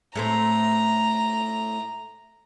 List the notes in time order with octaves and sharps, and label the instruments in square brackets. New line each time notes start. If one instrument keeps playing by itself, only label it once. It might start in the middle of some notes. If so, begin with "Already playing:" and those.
[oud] A2 A3 C4 [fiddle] A#5